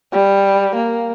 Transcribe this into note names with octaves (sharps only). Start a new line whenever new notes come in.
G3
A#3